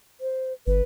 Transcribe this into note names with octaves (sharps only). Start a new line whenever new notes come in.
C5
G1 B4